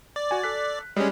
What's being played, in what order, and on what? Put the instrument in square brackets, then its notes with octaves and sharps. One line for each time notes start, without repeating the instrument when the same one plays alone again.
[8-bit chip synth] D5
[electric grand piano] F#4 G#5
A4 F#6 B6
[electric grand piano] G3 [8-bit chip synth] G#3 C#4